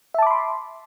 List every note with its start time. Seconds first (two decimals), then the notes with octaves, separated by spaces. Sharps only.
0.14 E5
0.18 A5
0.22 D6
0.27 B5
0.31 C6